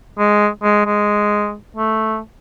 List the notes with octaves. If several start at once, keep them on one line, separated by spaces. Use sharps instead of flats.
G#3
G#3
G#3
A3